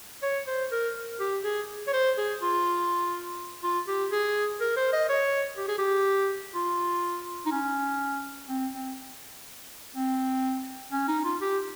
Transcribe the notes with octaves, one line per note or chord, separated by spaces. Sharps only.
C#5
C5
A#4
G4
G#4
C#5
C5
G#4
F4
F4
G4
G#4
A#4
C5
D#5
C#5
G4
G#4
G4
F4
D#4
C#4
C4
C4
C4
C#4
D#4
F4
G4